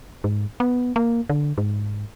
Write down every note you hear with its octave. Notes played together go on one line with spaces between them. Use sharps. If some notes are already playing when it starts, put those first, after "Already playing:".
G#2
B3
A#3
D3
G#2